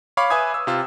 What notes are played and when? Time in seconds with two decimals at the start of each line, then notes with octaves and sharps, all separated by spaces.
0.17 C#5 F5 B5 C#6 D6
0.30 B4 E5 G#5 D6 D#6 G#6
0.54 E6
0.67 C3 F4 E6